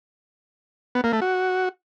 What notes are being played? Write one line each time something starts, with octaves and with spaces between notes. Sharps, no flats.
B3
A#3
A3
F#4